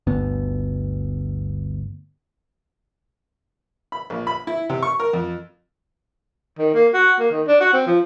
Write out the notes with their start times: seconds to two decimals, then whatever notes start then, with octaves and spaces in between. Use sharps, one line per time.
0.07 G1 D2 G2 B3
3.92 B5
4.10 A#1
4.27 B5
4.47 E4
4.69 C3
4.83 C#6
5.00 A#4
5.13 F2
6.59 D#3
6.74 A#3
6.94 F#4
7.20 A#3
7.31 D#3
7.47 D4
7.61 F#4
7.73 C4
7.87 F3